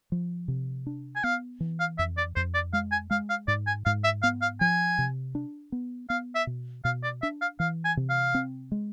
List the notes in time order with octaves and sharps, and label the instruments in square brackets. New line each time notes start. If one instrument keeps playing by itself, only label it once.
[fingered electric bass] F3
C3
D4
[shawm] G#5
[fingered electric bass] B3 [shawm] F5
[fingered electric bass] E3
[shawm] F5
[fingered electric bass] F2 [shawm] E5
[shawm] D5
[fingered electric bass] F2 [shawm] C5
[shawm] D5
[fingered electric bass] G#3 [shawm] F5
[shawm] G#5
[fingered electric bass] G#3 [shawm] F5
[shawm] F5
[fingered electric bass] G#2 [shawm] D5
[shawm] G#5
[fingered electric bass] G#2 [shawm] F5
[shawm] E5
[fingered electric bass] B3 [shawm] F5
[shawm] F5
[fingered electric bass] F3 [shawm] G#5
[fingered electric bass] C3
D4
B3
[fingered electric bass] B3 [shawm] F5
[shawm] E5
[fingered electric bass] B2
[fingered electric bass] B2 [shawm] F5
[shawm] D5
[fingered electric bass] D4 [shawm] E5
[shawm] F5
[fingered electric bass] E3 [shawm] F5
[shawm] G#5
[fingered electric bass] C3
[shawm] F5
[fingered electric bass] C4
G#3